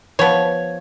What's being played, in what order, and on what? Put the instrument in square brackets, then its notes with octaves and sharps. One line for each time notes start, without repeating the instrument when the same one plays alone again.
[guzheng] F3 [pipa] B3 C#5